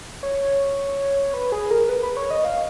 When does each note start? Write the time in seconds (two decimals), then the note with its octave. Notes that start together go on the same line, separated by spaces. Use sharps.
0.23 C#5
1.34 B4
1.52 G#4
1.71 A#4
1.89 B4
2.03 B4
2.17 C#5
2.31 D#5
2.45 F5